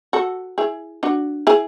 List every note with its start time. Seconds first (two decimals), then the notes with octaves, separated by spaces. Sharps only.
0.13 F#4 A4
0.58 E4 G#4
1.03 D4 F#4
1.47 E4 G#4